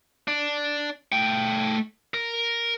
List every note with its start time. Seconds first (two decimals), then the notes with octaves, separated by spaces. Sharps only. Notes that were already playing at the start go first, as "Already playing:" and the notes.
0.28 D4
1.12 A3 G5
2.14 A#4